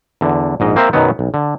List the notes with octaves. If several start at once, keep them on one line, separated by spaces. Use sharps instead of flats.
E2 D3
A#1 G#2 D#5
A#3 C4 A#4 C5 E5
F#2 B2 D#3 F#3 B3
B1
D3